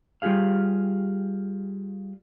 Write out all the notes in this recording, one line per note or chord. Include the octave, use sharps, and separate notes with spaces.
G3 F4 G4 G#4 F5